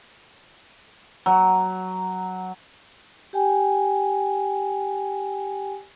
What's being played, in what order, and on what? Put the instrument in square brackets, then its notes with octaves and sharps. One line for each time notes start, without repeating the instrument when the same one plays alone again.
[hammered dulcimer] F#3
[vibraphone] G4 G5 G#5